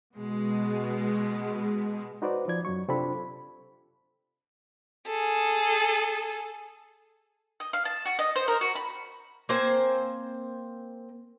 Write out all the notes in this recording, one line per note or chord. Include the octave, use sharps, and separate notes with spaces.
B2 G#3
D#4 F#4 B4 C5 D5
F3 D5 G#6
F#2 F#3 C#6
C3 C4 D4 F4 A4 B5
G#4 A4
D#5
F5
A5
F#4
D#5
C5
A#4
F#4
B5
A#3 C4 C5 G#5